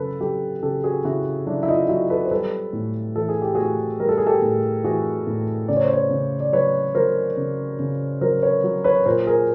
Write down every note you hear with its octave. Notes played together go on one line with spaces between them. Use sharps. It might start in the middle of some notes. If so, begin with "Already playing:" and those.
Already playing: C#3 F#3 A4 B4
F#3 G4 A4
C#3 G4 A4
F#4 G#4
C#3 E4 F#4
F#3 D4 E4
E4
D#4 F4
F#3 E4 F#4
A4 B4
C5
G3 A4 B4
A2
E3 A4
G#4
G4
A2 F#4 G#4
G3 A#4
A4
G#4
G4 A4
A2
E3 F#4 G#4
A2
C#3 D5
C#5
C5
B4 C#5
C#3
D5
F#3 B4 C#5
F#3 A#4 C5
C#3
C#3
F#3 A#4 C5
B4 C#5
F#3
B4 C#5
A#2 A#4 C5
G#4 A#4